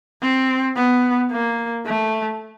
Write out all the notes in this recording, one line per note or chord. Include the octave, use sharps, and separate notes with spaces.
C4
B3
A#3
A3